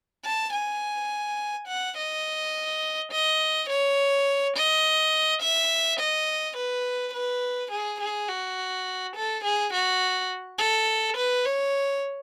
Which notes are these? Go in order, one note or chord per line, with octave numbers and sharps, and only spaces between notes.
A5
G#5
F#5
D#5
D#5
C#5
D#5
E5
D#5
B4
B4
G#4
G#4
F#4
A4
G#4
F#4
A4
B4
C#5